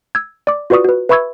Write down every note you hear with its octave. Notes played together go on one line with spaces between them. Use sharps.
E6 G#6
D5 D6
F4 F#4 B4 D5 C#6 D#6
F#4 B4
B4 E5 B5 C#6 E6 G#6